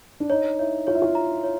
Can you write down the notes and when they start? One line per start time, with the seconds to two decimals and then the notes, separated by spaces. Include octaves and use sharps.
0.20 D4
0.30 D#4 C#5
0.59 E4 C#5
0.87 F4 C#5
0.95 E4
1.02 F4
1.15 A#5
1.44 C#5